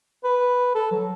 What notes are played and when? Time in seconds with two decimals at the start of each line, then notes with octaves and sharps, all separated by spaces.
0.24 B4
0.75 A4
0.91 F#3